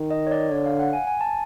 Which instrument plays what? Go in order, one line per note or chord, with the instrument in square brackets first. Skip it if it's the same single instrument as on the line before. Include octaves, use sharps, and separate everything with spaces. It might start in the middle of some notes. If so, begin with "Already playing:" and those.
Already playing: [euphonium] D#3
[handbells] D#5
C#5
D5
[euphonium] D3 [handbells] C#5
[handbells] F5
F#5
G#5
G#5
A5